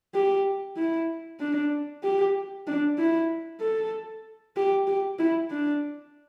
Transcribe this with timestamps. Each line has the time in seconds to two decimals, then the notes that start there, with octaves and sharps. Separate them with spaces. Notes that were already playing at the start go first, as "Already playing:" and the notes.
0.15 G4
0.77 E4
1.40 D4
2.03 G4
2.67 D4
2.98 E4
3.61 A4
4.56 G4
4.87 G4
5.19 E4
5.51 D4